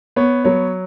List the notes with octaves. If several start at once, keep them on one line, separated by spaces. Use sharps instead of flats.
B3 C#5
F#3 C#5